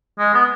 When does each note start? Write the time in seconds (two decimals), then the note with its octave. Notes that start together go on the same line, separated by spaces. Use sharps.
0.19 G#3
0.34 B3